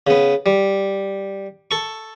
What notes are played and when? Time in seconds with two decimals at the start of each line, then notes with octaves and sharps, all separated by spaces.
0.07 C#3 B3
0.46 G3
1.71 A4 C#6